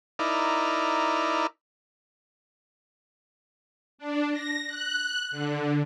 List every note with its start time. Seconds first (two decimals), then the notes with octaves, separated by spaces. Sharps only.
0.19 D#4 E4 A#4 D5
3.98 D4
4.32 A#6
4.67 F#6
5.31 D3